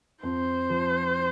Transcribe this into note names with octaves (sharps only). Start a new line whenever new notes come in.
F2 C5
F3